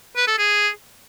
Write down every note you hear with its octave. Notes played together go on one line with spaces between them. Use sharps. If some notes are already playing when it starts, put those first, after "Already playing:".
B4
A4
G#4